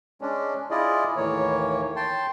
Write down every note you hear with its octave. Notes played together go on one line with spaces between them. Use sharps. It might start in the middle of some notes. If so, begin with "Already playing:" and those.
G#3 C#4 D4
E4 F4 G#4 D5 D#5
D#2 A2 E3 A#3 C#5
G5 A5 C6